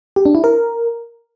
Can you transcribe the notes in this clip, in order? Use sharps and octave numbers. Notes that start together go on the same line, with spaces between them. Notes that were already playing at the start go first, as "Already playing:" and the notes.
G4
D4
E4
A#4